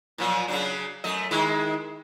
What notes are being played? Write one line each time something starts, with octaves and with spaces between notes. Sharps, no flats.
A#2 F3 F#3
C#3 F#3 D4
F#2 A3 D#5
D#3 G#3 E4